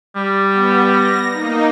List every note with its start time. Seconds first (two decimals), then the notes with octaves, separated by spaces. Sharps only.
0.16 G3
0.52 B3
0.86 A#6
1.31 A#3 D#4